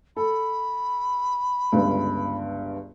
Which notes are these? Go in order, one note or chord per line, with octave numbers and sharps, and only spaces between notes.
A4 B5
G1 C#2 G2